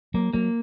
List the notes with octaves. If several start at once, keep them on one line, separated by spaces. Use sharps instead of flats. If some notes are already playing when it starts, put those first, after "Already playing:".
F#3 A#3
F#3 A#3